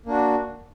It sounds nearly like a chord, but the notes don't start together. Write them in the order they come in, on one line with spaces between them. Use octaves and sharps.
A#3 D4 F#4